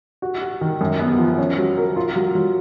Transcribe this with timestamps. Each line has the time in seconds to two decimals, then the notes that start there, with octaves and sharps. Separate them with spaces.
0.22 F#4
0.41 F#4
0.61 D#3
0.81 F#2
0.99 B3
1.18 F3
1.38 C#4
1.58 F#3
1.77 A#4
1.96 F4
2.16 F#3
2.35 F#3